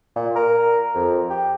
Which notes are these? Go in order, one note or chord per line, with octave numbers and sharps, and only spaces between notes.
A#2
A#4
F2
G4